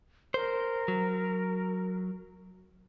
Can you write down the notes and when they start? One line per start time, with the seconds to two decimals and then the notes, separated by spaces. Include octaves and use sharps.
0.34 A#4 C5
0.88 F#3